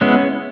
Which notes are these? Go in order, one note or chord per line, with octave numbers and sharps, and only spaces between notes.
G#3 B3 C#4 E4